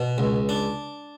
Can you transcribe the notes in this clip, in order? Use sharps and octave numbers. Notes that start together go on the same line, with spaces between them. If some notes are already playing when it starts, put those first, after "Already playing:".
Already playing: B2
C#2
D4